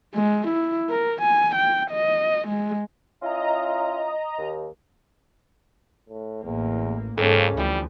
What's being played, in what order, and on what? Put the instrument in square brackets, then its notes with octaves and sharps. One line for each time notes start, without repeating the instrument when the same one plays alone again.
[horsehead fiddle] G#3
E4
A#4
G#5
G5
D#5
G#3
[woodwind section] C#4 E4 F4 [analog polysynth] D#5 A#5
[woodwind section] D#2
[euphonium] A2
[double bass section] A1 A#3 [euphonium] E2
[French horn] F2 [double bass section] G#2 C#4 [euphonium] C#3 [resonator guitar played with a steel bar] A#3 A4
[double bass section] D2 [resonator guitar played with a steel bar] E3 F3 [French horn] G3